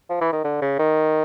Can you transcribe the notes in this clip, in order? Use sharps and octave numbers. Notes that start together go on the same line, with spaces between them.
F3
E3
D#3
D3
C#3
D#3